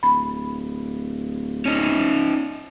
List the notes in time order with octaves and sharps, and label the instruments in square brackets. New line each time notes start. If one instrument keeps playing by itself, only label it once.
[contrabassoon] D1 [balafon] B5
[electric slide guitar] C#4 D#4